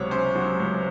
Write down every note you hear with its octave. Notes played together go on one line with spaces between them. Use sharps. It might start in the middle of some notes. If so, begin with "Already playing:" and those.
Already playing: C#2 C3 F#3 C#5
C#4 C5
F#3
C#2